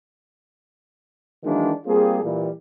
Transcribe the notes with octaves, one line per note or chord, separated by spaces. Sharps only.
D#3 E3 F#3 G#3 A#3 D4
G3 A#3 C4 F4 G#4
A#2 E3 G3